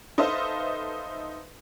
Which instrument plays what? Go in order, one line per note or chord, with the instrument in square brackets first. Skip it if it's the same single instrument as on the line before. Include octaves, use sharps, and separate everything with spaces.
[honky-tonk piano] D#4 A4 B4 C5 E5 F5